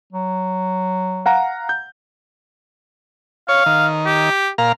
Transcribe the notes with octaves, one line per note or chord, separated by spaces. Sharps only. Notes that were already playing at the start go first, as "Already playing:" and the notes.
F#3
F5 F#5 A#5
G6
C#5 F5
D#3
G4
A#2 F5 A#5